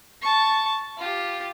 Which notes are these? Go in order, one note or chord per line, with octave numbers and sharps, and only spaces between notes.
A5 C#6
F4 G4